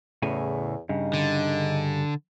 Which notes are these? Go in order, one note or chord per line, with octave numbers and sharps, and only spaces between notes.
E2 A2 C#3 G#5
G2 C#3 D#4
D3